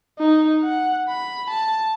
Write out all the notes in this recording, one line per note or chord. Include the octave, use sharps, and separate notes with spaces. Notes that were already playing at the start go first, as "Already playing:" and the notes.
D#4
F#5
B5
A5